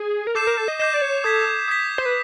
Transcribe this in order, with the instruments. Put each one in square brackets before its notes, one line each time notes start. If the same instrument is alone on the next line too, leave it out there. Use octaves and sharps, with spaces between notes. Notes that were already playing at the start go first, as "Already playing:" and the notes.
Already playing: [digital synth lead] G#4
A#4
[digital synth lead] A4 [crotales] D6 G6 C7 E7
[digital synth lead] A#4
A4
D#5
[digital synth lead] D#5 [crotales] D6 G6 C7 E7
[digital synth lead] D5
C#5
[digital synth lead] A4 [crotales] D#6 G#6 B6
[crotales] D#6 G#6 B6
[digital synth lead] C5
B4